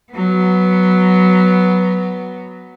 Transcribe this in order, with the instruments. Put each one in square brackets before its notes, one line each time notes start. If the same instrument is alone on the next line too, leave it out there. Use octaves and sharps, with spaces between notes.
[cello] F#3 B3